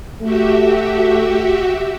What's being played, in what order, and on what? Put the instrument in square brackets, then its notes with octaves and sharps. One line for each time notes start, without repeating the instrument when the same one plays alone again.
[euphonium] A3 [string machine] F#4 G4 E5